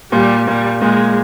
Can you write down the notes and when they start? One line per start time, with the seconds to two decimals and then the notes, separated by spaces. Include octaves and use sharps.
0.12 A#2 G3
0.47 A#2 G3
0.81 A#2 G#3